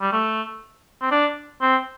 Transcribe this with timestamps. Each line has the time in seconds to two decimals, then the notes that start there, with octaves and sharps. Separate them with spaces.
0.01 G3
0.13 A3
1.02 C4
1.11 D4
1.62 C4